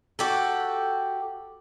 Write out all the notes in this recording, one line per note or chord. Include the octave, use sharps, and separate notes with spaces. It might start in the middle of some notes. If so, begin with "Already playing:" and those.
F#4 G4 A4